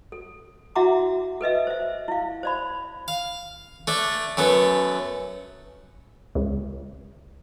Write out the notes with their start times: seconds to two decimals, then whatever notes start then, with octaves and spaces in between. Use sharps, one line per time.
0.12 A4
0.75 E4 F#4 E5 F#5 A#5 D6
1.41 A4 B4 D#5 E5
1.67 C5 E5
2.08 E4 F5
2.43 C5 D5 B5
3.08 F5
3.87 A3 D4
4.37 F#2 A3 B3
6.35 C#2